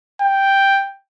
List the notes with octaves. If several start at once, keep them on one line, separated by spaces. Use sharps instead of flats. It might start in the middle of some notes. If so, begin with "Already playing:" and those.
G5